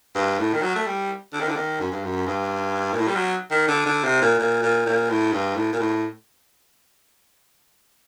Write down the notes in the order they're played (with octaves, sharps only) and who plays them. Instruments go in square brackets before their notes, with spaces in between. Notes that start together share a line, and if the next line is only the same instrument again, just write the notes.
[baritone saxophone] G2
A2
D#3
F#3
A3
G3
D3
D#3
D3
D#3
F#2
G2
F#2
G2
A#2
A2
G3
F#3
D#3
D3
D3
C3
A#2
A#2
A#2
A#2
A2
G2
A2
A#2
A2